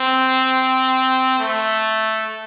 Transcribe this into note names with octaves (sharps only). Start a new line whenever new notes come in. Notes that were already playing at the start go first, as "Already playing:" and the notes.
Already playing: C4
A3